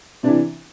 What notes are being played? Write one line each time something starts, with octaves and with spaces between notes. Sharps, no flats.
C3 E3 D4